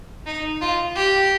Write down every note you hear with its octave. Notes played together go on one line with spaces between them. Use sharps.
D#4
F4
G4